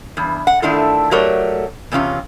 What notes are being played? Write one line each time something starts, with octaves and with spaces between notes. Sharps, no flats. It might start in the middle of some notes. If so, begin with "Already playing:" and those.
E2 G2
F#5
D#3 A3 D4 E4 F4 A4
F#3 A3 G4 A#4 C#5 D5
E2 C3 C#4 E4 F4